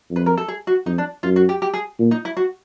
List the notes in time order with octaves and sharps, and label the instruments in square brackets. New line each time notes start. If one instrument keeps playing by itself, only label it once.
[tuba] F2
[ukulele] B4
A#4
A4
G#4
F#4
[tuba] F2 [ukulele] D#4
[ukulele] D4
[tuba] F#2 [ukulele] F4
[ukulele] F#4
G4
G4
G#4
[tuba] A#2
[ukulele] D#4
E4
F#4